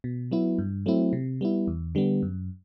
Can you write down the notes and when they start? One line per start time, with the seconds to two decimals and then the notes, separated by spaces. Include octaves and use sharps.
0.04 B2
0.31 F#3 B3 E4
0.58 G2
0.86 F#3 A3 C4 E4
1.13 C3
1.41 G3 B3 E4
1.67 E2
1.95 D3 G3 B3
2.22 F#2